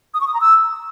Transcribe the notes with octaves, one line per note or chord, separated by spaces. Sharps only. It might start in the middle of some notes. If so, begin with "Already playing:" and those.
D#6
C#6
D#6
A#5
E6